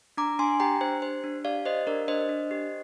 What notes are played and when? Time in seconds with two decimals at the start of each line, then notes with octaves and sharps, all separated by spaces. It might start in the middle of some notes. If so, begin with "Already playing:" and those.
0.17 D4 A#5 D6
0.39 D4 G#5 C6
0.60 G4 G5 A#5
0.81 D4 C5
1.02 G4 C5
1.24 D4
1.44 G4 D5 F5
1.65 G4 C5 D#5
1.87 D4 A#4 D5
2.08 D4 C5 D#5
2.29 D4
2.51 G4